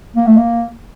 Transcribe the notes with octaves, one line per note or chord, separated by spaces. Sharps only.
A#3
A3
A#3